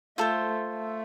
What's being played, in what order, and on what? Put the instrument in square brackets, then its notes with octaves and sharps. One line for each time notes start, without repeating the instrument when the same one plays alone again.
[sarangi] A3 [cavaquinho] F4 A4 C5
[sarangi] A3